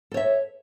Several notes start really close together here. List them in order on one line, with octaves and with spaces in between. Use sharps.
A4 C#5 E5